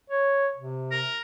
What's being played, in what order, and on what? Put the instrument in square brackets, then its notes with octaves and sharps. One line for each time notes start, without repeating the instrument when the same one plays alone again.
[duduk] C#5
C3
[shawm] A#4